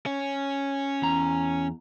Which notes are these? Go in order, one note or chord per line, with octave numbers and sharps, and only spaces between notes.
C#4
E2 A#5